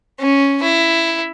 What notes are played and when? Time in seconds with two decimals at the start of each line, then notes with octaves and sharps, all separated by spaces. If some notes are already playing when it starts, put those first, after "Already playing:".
0.20 C#4
0.63 E4